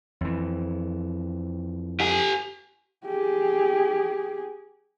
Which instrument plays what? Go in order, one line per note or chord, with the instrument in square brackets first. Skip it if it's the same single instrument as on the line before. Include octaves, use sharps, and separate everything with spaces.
[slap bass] F2 E3
[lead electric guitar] G4 G#5
[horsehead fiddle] G4 G#4